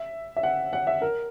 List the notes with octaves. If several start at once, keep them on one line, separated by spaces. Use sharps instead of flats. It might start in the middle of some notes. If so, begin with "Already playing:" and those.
Already playing: E5
E5
F#5
F#5
E5
A#4